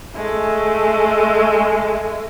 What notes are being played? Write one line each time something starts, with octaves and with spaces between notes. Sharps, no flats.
G#3 A3